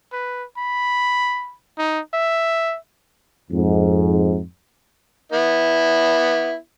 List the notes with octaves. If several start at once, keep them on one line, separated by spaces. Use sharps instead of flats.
B4
B5
D#4
E5
F2 G#2
B3 E4